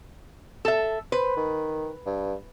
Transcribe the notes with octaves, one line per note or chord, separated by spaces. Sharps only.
A4 E5
B4 C5
D#3
G2